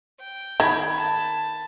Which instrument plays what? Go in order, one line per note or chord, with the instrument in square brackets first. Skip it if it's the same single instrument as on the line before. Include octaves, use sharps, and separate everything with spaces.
[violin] G5
[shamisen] D#3 [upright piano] B5 G#6
[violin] A5